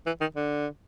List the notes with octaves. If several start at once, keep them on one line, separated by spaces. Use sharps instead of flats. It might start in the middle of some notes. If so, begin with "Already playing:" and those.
E3
D#3
D3